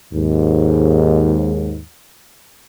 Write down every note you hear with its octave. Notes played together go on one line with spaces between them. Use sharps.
D#2 G#2